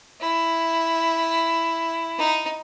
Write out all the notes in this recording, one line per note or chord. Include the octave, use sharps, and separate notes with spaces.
E4
D#4